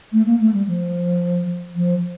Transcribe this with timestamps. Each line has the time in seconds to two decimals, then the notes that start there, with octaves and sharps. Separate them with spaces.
0.12 A3
0.26 A#3
0.40 A3
0.54 G3
0.67 F3
1.75 F3